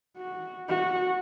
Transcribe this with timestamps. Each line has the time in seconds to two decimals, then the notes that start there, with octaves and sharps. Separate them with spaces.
0.17 F#4
0.69 F#4